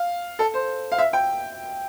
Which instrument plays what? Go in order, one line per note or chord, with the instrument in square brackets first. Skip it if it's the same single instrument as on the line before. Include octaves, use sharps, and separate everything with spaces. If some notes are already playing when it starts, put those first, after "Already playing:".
Already playing: [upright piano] F5
A4
C5
F5
E5
G5